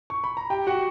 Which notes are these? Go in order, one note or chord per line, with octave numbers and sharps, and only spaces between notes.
C#6
B5
A#5
G4 G5
F#4 F#5